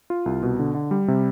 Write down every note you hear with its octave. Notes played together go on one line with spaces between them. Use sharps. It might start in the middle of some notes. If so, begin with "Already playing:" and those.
F4
C2
B2
D3
D3
G3
C3